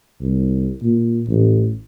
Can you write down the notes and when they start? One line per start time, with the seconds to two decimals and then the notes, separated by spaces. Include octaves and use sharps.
0.21 C2
0.82 A#2
1.28 A1